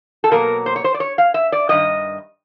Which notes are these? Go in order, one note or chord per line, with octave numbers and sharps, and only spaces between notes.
A4
B2 F#3 A#3 A#4
C5
C#5
C5
D5
C#5
F5
E5
D5
G2 D#3 D#5